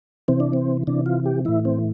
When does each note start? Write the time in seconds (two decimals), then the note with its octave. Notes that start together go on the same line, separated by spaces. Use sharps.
0.28 C3 E3 C4
0.40 D4
0.53 C4
0.87 C3 E3 D4
1.06 F4
1.26 G4
1.45 A2 E3 E4
1.65 C4